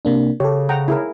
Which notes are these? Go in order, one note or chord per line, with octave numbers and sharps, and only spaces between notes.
C3 A#3 D4
C#3 G4 A4 C#5
F#5 G5 A#5
E4 G#4 A#4